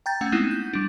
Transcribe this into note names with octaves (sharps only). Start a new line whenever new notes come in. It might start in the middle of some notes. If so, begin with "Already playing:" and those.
G5 A#5 G6 A6
A3 C#4 F#5
G#3 B3 C4 D#4 E4
G6
G3 D4